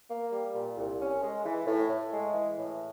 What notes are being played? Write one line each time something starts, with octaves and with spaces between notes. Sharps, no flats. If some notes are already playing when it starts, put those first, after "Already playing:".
A#3
G3
A#2
C2
C#4
G#3
E3
A2
A2
G#3
E3
A2